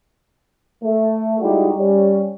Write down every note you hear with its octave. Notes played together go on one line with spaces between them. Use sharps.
A3
G3 G#3 D#4 E4 F#4 G4
G3 C#4